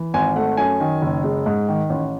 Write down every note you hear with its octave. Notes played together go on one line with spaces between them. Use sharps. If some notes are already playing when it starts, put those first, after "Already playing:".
Already playing: E3
G#1 G#5
A3 F#5
F#2 G#5
D#3
F#1
G#3
G#2
D#3
A1